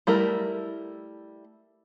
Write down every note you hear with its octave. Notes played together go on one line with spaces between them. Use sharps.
G3 A3 E4 A#4